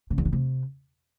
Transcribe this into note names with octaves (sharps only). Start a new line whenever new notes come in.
C#3
E2
D3
C3